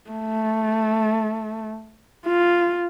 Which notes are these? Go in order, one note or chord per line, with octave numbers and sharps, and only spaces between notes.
A3
F4